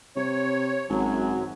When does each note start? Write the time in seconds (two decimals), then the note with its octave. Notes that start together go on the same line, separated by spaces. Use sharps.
0.16 C3 C#5
0.89 G#1 F#2 F#3